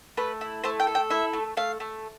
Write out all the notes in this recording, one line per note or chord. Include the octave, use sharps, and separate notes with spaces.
A3 B4
E4
A3 C5
G5
A4
G5
E4 E5
A3
A3 F5
A3